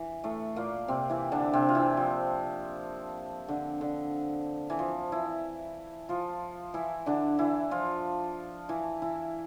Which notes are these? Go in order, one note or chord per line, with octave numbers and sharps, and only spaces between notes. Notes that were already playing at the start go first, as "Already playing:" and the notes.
Already playing: E3
A2 A3
A#2 A#3
C3 C4
E3 E4
D3 D4
C3 C4
F4
E3 E4
F3
D3
D3
E3
F3
E3 E4
F3 F4
E3 E4
D3 D4
E3 E4
F3 F4
E3 E4
E3 E4